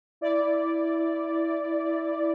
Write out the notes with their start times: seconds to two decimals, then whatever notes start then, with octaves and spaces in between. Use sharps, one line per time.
0.21 E4 D5